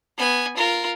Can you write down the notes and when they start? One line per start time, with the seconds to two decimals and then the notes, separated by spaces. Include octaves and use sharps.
0.18 B3 G#5
0.57 F4 A#4